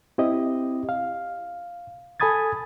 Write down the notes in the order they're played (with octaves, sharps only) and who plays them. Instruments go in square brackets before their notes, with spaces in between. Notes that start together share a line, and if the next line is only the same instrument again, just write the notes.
[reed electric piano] C4 E4 G4 D#5
F5
A4 G#5 B5 D#6 G#6 A6